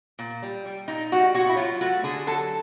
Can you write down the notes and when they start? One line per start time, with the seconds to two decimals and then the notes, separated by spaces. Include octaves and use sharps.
0.19 A#2
0.42 G3
0.66 G3
0.88 A#2 D#4
1.12 G3 F#4
1.34 A#2 F#4
1.49 E4
1.57 F#3 F4
1.81 A3 F#4
2.03 D3 G#4
2.27 F#3 A4